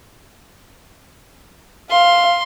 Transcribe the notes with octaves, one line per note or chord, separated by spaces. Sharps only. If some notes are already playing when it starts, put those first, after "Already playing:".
F5 C6